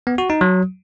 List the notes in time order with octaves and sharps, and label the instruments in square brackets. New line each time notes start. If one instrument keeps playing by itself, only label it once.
[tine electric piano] B3
F#4
D#4
F#3